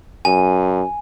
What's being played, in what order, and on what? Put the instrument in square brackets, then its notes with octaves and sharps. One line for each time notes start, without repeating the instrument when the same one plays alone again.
[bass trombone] F#2 [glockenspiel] G#5